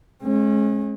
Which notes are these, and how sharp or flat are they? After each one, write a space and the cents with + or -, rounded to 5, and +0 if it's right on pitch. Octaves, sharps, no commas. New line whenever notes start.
G#3 +30 C#4 -30